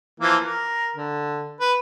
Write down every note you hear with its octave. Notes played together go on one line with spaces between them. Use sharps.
E3 F3 A#3
A#4
D3
B4